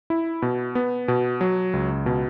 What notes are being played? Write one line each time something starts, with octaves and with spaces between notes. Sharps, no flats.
E4
B2
B3
B2
F#3
C#2
B2